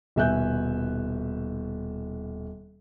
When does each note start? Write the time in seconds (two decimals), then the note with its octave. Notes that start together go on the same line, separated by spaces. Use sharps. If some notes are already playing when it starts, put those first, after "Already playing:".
0.16 D#1 B2 E5 G#5 F#6 G6